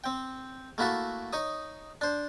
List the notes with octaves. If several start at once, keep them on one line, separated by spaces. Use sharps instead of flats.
C4 G5
A3 A#3 E4 F#4 A4
D#4 C#5 D#6
D4 C5